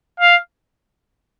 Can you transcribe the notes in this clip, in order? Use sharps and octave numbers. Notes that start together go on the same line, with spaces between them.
F5